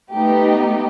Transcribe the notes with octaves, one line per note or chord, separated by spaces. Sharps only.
A3 B3 D#4 G4